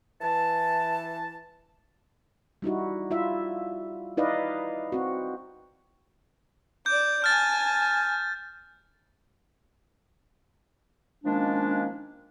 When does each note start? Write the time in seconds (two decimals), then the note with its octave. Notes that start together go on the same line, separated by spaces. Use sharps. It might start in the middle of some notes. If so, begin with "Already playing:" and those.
0.21 E3 A5
2.62 G3 D#4 E4 F#4
3.11 E4 F4 E5
4.17 D#4 E4 B4 D5 D#5 F5
4.92 C4 F#4
6.86 D5 D6 G6
7.24 G#5 A5 F6 A6
11.24 D#3 F3 G#3 A#3 C#4 D4